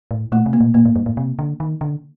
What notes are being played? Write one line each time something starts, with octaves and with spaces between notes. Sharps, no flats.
A2
A#2 A3
C3
A#3
A#2
A#2 A#3
A2
G2
A2
C3
D3
D#3
D3